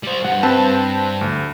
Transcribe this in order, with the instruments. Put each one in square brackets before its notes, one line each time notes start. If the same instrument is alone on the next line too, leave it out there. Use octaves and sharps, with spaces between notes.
[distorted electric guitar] G3 C5
[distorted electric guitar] G2 [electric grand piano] F#5
[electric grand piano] C4 B4 A5
D2